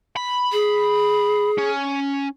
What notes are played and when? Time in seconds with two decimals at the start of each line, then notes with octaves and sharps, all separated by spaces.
0.16 B5
0.52 G#4
1.58 C#4